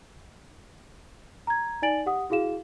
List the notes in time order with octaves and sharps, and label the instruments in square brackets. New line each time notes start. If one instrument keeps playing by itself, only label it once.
[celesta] A#5 G#6
D#4 D5 G#5 A6 D7 F#7
G4 F#5 D#6
E4 F#4 G#4 F5 E7